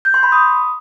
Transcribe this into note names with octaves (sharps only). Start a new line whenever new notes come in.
G6
C6
B5
D#6